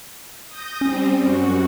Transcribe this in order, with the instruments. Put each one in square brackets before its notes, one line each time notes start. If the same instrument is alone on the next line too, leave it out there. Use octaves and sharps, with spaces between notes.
[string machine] D#6 G6 A#6
[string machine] G3 C4 [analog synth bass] C#4
[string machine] F#2 F#4